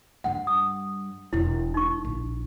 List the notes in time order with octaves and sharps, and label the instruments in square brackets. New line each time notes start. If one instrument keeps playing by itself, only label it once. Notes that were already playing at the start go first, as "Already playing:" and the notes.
[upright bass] G2 G3 [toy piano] F#5
[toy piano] D#6
[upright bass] E1 B2 [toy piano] E4
[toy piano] D#4 C#6
[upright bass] A#1